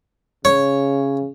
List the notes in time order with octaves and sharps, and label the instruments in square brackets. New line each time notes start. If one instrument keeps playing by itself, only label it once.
[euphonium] C#3 [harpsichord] C#5